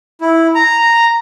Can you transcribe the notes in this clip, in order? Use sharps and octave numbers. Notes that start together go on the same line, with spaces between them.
E4
A#5